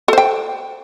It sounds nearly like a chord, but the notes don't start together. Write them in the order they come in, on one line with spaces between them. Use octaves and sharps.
A4 C5 G5